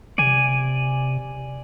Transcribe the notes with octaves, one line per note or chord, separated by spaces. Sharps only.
C3 D5 G#5